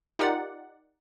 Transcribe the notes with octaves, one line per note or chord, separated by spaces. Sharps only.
D#4 F4 G4 A#4 D5 F#5